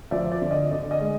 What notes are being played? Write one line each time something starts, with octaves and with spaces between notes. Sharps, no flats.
F3 D5 E5
D5
D3
D#5
D3 D5
D#5
G#3